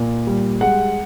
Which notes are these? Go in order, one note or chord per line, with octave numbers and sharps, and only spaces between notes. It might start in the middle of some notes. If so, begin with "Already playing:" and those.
Already playing: A#2
G3
G#3 F#5